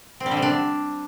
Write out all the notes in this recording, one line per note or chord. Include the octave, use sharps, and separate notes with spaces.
C4
G3
D3
C3
D4